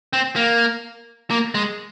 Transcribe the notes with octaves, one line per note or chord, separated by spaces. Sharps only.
C4
A#3
A#3
G#3